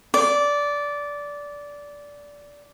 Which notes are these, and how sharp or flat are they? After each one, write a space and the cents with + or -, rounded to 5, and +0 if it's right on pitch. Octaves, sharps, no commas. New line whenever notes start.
D5 -15